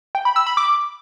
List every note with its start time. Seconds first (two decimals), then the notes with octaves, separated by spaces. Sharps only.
0.15 G5
0.25 B5
0.36 E6
0.46 B5
0.57 D6